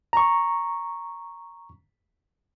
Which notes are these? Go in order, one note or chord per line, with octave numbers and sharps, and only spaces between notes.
A#5 C#6